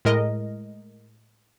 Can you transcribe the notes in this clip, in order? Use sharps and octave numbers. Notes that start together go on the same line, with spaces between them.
A2 G#3 A#4 D#5